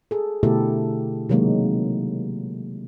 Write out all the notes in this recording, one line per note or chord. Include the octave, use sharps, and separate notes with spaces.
G#4 A4
B2 D3 A3 E4 G4 A4
C3 D#3 F#3 G#3 A#3 D#4